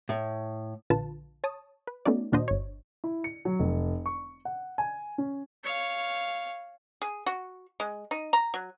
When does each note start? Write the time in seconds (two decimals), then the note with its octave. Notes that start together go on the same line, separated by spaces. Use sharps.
0.09 A2
0.90 A#1 D3 F4 B4 A5
1.44 C#5 A5 D#6
1.87 B4
2.05 A3 B3 C#4 D#4 F#4 D5
2.32 D#2 A#2 D4 F#4 C5 D#5
2.48 G1 C#5
3.04 E4
3.24 C#7
3.45 F#3
3.59 F1
4.06 C#6
4.45 F#5
4.78 G#5
5.18 C#4
5.64 C#5 F5
7.02 G#4
7.26 F#4
7.80 G#3
8.11 D#4
8.33 A#5
8.54 F#3